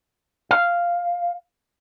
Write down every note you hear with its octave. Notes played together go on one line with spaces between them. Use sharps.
F5